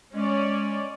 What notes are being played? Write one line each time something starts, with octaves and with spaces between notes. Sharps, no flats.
G#3 C#4 D5